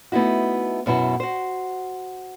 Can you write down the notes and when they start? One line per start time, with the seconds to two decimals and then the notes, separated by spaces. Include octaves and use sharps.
0.12 A3 B3 D#4 E4 F#4
0.86 F#2 B2 B3 E4
1.20 F#4 C5